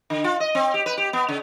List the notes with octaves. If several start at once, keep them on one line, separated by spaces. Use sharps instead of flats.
D3
F4
D#5
C4
G4
B4
G4
B3
C#3